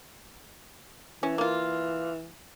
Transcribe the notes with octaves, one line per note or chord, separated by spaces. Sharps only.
E3 C#4
A#3 F4